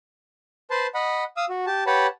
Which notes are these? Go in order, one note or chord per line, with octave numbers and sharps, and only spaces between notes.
B4 C5 A5 C6
D#5 F#5 B5
F5 D#6 E6
F#4
G4 A5
G4 B4 C#5 F#5 A5 B5